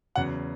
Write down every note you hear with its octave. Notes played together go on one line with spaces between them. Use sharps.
E2 C#3 F#3 F#5